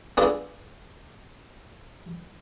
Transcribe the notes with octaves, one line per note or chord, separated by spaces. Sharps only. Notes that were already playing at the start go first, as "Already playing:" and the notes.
B3 D4 F4 G#4 A4